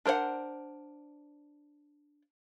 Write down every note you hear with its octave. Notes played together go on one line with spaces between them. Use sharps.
D4 A#4 C5 C#5 F#5